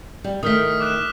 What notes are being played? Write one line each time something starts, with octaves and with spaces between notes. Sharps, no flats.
G3
D#3 A3 D#6 F6 B6
D6 F#6 E7